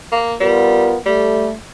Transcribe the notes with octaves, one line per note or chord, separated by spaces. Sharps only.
A#3
G3 B3 F4 A#4
G3 A3